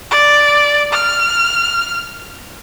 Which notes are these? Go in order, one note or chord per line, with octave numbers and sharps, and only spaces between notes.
D5
F6